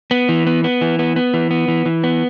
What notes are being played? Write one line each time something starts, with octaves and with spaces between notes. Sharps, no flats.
B3
E3
B3
B3
E3
B3
B3
E3
B3
E3
E3
B3